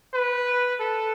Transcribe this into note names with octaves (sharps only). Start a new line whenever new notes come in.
B4
A4